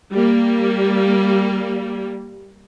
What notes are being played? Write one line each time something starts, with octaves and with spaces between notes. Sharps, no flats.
G3 A#3